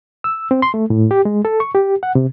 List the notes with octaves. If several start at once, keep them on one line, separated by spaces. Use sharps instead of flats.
E6
C4
C6
A3
A2
G4
G#3
A4
C#6
G4
F#5
C3